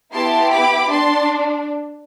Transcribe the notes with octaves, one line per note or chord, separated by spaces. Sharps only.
B3 E4 G4 A5 C6
B5 D6
D4 A5 C6